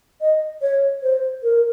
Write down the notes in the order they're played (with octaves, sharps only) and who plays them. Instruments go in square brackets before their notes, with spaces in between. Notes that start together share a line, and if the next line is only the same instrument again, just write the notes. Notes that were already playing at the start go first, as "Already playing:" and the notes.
[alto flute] D#5
C#5
C5
A#4